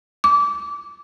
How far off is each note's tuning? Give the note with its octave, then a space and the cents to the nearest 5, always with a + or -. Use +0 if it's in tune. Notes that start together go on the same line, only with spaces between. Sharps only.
D6 -20